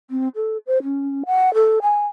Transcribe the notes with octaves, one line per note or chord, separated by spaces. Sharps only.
C4
A4
C5
C#4
F#5
A4
G#5